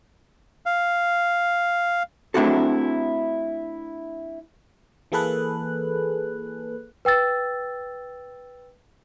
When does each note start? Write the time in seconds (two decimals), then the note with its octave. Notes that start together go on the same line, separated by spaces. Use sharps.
0.66 F5
2.34 A3 C4 D4 E4 F#4 A4
5.12 E3 A#3 G#4 A4 B4 F#6
7.05 B4 G5 E6 A6